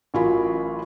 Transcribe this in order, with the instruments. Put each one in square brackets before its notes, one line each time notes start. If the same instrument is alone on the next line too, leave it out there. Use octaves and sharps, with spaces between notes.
[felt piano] A1 F#3 F4 A#4 G#5 B5